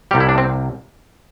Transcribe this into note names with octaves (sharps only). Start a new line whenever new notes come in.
C2 C3 G3 G4
E4
D4
C4